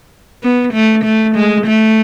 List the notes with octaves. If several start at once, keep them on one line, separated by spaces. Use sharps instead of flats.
B3
A3
A3
G#3
A3